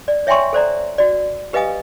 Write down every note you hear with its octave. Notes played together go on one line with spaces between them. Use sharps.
D5
C#5 E5 G5 G#5 C6 C#6
A4 C5 D5 A#5
F#4 D5
G4 B4 D#5 F5 G#5 D#6